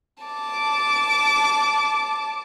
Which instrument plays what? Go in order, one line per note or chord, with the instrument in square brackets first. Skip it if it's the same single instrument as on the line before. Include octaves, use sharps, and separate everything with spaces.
[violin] A5 D6